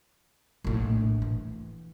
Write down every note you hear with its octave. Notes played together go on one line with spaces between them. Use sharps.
A#1 A2
E3